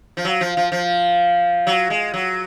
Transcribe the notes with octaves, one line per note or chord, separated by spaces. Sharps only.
F3
F#3
F3
F3
F3
F#3
G#3
F#3